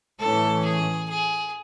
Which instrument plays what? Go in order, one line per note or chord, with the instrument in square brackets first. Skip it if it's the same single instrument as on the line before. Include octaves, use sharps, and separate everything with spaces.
[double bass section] A2 E3 A3 C#4 [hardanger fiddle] A4
[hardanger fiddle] G#4
G#4